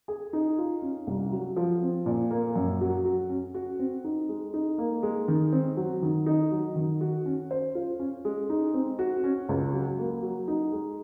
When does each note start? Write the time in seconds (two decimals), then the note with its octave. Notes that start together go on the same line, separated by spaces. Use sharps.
0.08 G#4
0.33 D#4
0.58 F4
0.82 C#4
1.07 C2
1.32 F#3
1.56 F3
1.82 C4
2.06 A#2
2.31 A#3
2.56 F#2
2.81 F#3
3.05 F#4
3.30 C#4
3.54 F#4
3.79 C4
4.04 D#4
4.29 G#3
4.54 D#4
4.78 A#3
5.03 G#3
5.28 D#3
5.52 C4
5.77 F#3
6.02 D#3
6.26 D#4
6.52 F#3
6.76 D#3
7.01 F#4
7.26 C#4
7.51 C5
7.75 F4
8.00 C#4
8.25 G#3
8.50 D#4
8.74 C4
8.99 F#4
9.24 C#4
9.49 C#2
9.74 F#3
9.98 A#3
10.23 F#3
10.48 D#4
10.72 G#3